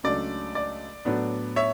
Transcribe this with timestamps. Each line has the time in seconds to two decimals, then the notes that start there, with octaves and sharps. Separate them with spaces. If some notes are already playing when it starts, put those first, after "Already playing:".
0.03 C#2 C#3 F#3 A3 D4 D5
0.55 D5
1.05 A2 F#3 B3 D4
1.56 C#5 E5